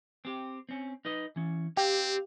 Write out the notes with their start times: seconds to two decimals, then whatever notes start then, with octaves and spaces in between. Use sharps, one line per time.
0.25 C4 G4
0.69 C4 C#4
1.05 D#4 B4 D#5
1.36 E3 C#4
1.77 C4 G4 F5